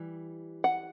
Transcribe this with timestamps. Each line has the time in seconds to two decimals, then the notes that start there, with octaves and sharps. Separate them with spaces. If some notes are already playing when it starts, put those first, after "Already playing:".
Already playing: E3 G3
0.64 F#5